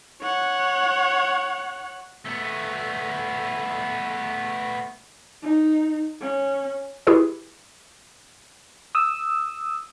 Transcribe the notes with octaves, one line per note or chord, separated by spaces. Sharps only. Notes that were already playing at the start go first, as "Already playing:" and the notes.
C#5 F#5
A3 B3
D#4
C#4
E4 G4 G#4 B4
D#6 E6